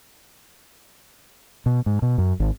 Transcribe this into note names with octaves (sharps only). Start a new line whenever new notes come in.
B2
G#2
B2
F#2
G#1